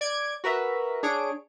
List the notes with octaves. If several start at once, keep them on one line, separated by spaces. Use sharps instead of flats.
D5 G#6 D7
F#4 A#4 B4 E5
D4 G#4 C#5 D7